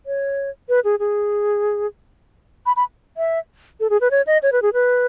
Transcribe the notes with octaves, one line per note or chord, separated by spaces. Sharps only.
C#5
B4
G#4
G#4
B5
B5
E5
A4
G#4
B4
C#5
D#5
C#5
B4
G#4
B4